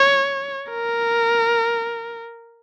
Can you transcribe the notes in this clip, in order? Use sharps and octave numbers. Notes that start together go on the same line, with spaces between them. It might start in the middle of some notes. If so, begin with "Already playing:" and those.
Already playing: C#5
A#4